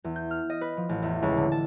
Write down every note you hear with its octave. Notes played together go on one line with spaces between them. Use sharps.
E2
G6
F6
D#5
B4
F3
A1
E2
C#2
D3
A5